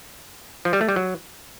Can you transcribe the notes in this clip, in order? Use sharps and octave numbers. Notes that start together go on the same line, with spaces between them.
F3
G3
A3
G3
F#3